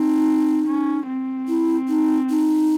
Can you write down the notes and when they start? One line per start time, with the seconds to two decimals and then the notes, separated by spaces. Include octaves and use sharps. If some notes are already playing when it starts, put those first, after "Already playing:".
Already playing: C4 D#4
0.66 C#4
1.08 C4
1.48 E4
1.88 D#4
2.30 D#4